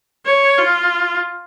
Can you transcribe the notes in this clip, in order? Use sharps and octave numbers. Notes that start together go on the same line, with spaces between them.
C#5
F4